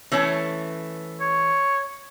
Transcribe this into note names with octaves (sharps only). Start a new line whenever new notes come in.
E3 A3 C#4
C#5